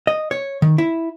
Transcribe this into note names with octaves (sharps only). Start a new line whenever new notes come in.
D#5
C#5
D#3
E4